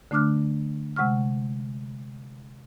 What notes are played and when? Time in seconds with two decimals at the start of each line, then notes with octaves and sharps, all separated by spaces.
0.11 D3 A3 D4 D6 F6 F#6
0.96 C3 G#3 F#5 C#6 F6